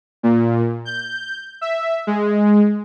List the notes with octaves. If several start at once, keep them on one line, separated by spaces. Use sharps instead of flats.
A#2
G6
E5
G#3